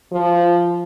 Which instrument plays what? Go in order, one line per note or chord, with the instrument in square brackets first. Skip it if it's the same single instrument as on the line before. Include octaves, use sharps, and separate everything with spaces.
[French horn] F3